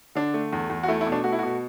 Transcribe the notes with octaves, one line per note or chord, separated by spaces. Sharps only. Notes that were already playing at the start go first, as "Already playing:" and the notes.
D3 D4
A3
E2
E2
F#4
A3 E4
E4
B2
D4
A3 F#4
E4
B2 F#4